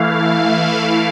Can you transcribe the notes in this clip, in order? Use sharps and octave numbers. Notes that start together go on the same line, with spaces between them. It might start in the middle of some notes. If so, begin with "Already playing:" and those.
Already playing: E3 A3 E4 F5